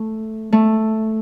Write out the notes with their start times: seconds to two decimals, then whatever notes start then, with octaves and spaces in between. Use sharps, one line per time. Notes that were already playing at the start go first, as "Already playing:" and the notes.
Already playing: A3
0.53 A3